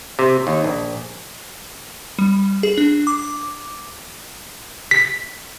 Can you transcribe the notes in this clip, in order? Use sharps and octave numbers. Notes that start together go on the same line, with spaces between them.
C3
D#2
A#1
G3
G#4
D4
D6
B6